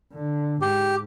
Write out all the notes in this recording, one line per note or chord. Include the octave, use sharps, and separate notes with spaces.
D3
G#2 G4